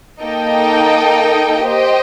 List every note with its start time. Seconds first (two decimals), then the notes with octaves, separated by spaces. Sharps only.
0.22 A#3 D#4 A4 D#5 G5
1.68 G4 C5 D#5 G5